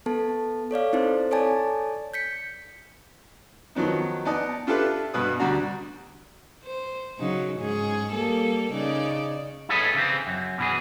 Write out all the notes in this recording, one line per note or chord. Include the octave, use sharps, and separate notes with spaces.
B3 A4 A5
A4 C#5 D5 F5
C4 D#4 E4 A4 C5
A4 C#5 D5 G#5 A5
G6 B6 C#7
D#3 F3 F#3 B3 D#4
B3 D#4 D5 D#5 A5 D#6
D4 F4 G4 A4 B4 E5
G2 B2 B4 D#6
D2 G3 D4 F#4 A#5
C5
C#3 F#3 D#4
G#2 C#4 G#4
G3 A#3 A4
C#3 D#4 D5
E4 G#4 A4 B4 C#5 D#5
C#3 E3 C4
F#2
B2 E3 G#4